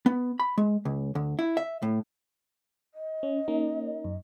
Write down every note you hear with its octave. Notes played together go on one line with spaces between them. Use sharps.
B3
B5
G#3
C#2
D2
E4
E5
A2
D#5
C#4
A#3 C#4 D#4
F#2